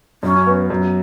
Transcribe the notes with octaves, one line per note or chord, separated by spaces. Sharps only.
F#2 C#4
B3
F#2